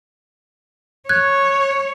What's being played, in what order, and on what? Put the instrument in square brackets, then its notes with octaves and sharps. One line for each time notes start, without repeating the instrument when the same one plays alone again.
[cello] C#5 [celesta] F#6 G#6